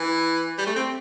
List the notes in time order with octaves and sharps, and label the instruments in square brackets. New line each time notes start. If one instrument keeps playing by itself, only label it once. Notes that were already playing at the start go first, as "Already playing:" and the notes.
Already playing: [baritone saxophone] E3
G3
A3
C4